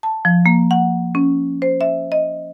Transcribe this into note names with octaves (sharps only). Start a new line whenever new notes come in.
A5
F3
A#3
F#5
C#4
C5
E5
D#5